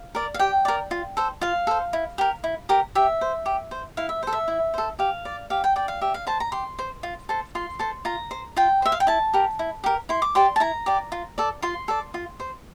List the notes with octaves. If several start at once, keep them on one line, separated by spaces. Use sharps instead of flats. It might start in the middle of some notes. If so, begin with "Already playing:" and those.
Already playing: F5
A#4 D5
F5
G4 G5
A#4 D5
F4
A4 C5
F4 F5
A4 C5
E4
G4 A#4
E4
G4 A#4
G4 E5
C5
G4
C5
E4 F5
E5
A4 C5
E5
E4
A4 C5
G4 F5
D5
G4 F5
G5
D5 G5
F5
G4 E5
F5
C5 A5
A#5
G4 C6
C5
F4
A4 C5
F4 C6
A4 C5
F4 A#5
C5
F4 G5
C5 E5
F5
G5
E4 A5
G4 A#4
E4
G4 A#4
E4 C6
D6
G4 D5 C6
A5
E4 A#5
G4 D5
F4
A4 D5
F4 C6
A4 D5
F4
C5